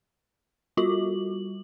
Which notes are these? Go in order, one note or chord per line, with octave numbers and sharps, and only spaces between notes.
G3 F4 F#4 F#7